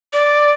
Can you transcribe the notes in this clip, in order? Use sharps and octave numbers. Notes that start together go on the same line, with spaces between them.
D5